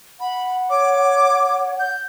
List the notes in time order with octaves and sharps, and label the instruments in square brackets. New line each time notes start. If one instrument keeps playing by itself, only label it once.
[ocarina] F#5 [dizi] B5
[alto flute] C#5 [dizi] D6
[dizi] G6